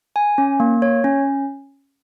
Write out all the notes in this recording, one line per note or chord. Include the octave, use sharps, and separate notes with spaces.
G#5
C#4
A#3
C#5
C#4